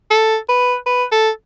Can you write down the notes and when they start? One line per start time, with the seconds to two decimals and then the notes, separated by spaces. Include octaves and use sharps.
0.10 A4
0.49 B4
0.86 B4
1.12 A4